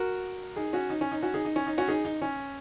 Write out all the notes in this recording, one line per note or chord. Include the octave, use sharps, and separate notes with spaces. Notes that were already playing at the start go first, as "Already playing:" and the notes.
Already playing: F#4 A#4
D#4 G#4
C#4 F#4
D#4
C#4
D#4
C#4 F#4
D#4 G#4
D#4
C#4
D#4
C#4 F#4
D#4 G#4
D#4
C#4